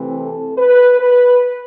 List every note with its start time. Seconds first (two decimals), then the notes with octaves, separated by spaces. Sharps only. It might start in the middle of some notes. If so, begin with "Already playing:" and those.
Already playing: C3 E3 A3 C4
0.16 A4
0.57 B4
0.99 B4